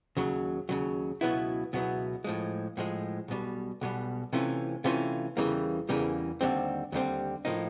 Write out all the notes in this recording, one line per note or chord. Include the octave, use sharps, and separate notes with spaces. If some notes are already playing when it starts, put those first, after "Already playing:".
D#2 C#3 F#3
D#2 C#3 F#3
C#2 B2 F#3 B3 E4
C#2 B2 F#3 B3 E4
A2 F3 G#3
A2 F3 G#3
B1 B2 G3
B1 B2 G3
C3 E3 A3 C#4 F4
C3 E3 A3 C#4 F4
E2 C#3 E3 G3 A#3
E2 C#3 E3 G3 A#3
D#2 D3 G3 C4
D#2 D3 G3 C4
A2 F3 A#3 D#4